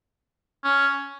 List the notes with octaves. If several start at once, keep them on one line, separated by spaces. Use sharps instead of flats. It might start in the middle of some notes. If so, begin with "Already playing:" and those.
C#4